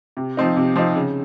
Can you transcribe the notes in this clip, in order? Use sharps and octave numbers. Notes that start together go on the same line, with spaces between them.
C3
F3 C4 D#4
C3
F3 C4 D#4
C#3